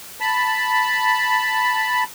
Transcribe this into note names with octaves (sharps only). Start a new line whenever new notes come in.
A5 B5